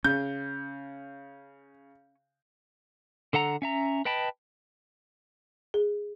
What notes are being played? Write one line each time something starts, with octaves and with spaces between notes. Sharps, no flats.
C#3 C#4 G6
D3 A4 F#5 A#5
C#4 E5 A#5
B4 D#5 G5 A5 B5
G#4